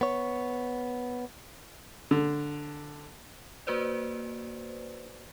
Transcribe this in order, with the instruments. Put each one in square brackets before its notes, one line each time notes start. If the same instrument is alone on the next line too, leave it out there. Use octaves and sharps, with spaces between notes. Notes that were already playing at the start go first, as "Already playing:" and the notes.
[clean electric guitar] B3 C#5
[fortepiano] D3
[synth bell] A#3 F#4 B4 C5 D5